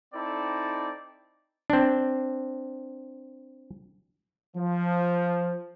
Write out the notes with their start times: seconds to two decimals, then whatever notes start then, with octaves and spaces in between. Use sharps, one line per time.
0.14 C4 D#4 E4 A4 D5
1.70 C4 D4
4.56 F3